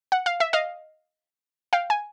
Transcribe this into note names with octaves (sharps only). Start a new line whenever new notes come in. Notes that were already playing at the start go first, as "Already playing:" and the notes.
F#5
F5
E5
D#5 F5
F5 G5
G#5